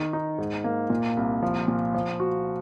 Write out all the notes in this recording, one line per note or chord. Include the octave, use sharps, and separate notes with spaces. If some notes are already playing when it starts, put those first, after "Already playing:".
Already playing: D#3
D#4
G#2
A#3
A#2
C2
F3
A#2
F3
F#4